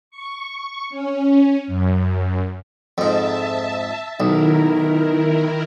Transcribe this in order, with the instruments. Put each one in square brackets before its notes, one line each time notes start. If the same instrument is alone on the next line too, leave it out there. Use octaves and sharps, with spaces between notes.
[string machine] C#6
C#4
F#2
[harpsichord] F2 G#2 [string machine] E5 A5
[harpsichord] B1 [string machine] D#3 E4 A#4 [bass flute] D#4